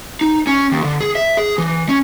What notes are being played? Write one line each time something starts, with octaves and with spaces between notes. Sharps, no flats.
D#4
C#4
D#2
D3
G#4
E5
G#4
E3
C#4